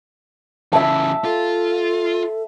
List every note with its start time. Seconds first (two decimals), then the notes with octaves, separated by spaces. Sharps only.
0.73 C#3 E3 E5 A5
1.25 F4 A4